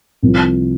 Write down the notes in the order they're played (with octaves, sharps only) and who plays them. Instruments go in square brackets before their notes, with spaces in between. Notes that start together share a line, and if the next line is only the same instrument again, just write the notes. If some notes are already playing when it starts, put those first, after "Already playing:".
[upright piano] C2 C3 F3